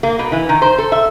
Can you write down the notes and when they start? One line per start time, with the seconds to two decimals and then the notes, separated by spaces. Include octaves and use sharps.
0.03 A#3
0.19 B2
0.32 E3
0.49 D#3
0.62 C5
0.78 A4
0.92 E5